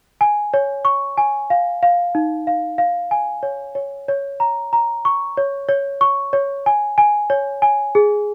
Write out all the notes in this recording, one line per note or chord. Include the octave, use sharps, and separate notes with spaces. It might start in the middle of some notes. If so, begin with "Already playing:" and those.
G#5
C#5
C#6
G#5
F5
F5
D#4
F5
F5
G#5
C#5
C#5
C#5
A#5
A#5
C#6
C#5
C#5
C#6
C#5
G#5
G#5
C#5
G#5
G#4